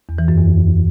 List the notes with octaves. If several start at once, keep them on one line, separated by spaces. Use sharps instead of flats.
E2
E3
F#2
E2